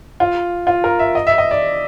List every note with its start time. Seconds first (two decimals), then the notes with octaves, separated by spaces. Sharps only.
0.20 F4
0.67 F4
0.84 A#4
0.99 E5
1.15 D#5
1.27 E5
1.38 D#5
1.51 D5